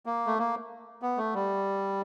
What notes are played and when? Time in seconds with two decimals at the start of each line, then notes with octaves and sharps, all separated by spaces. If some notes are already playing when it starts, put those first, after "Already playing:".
0.06 A#3
0.27 A3
0.39 A#3
1.02 B3
1.17 A3
1.35 G3